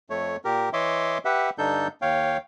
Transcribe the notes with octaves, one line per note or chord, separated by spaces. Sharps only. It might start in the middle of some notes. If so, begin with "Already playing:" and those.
F2 A3 C#5
A#2 G4 A#4
E3 C#5 D#5 E5 C6 D6
G4 B4 E5 F#5
G2 D3 D4 D#4 A4 G6
D#2 C#5 F5 G5